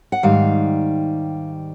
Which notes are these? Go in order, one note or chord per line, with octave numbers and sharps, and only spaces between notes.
F#5
G#2 D#3 G3 F5